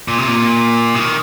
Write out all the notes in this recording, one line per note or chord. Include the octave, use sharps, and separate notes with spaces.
A#2
C3
A#2
C3
D#3